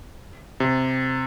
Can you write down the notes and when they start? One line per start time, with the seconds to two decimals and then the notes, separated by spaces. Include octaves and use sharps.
0.60 C3